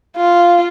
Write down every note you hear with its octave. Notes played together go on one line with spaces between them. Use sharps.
F4